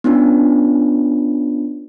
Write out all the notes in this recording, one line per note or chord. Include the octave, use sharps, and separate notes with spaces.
B3 C#4 D4 F4